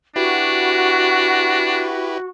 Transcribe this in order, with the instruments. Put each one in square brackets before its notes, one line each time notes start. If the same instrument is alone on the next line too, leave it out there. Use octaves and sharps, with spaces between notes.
[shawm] D4 [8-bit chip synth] E4 G4 B4 [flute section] F#4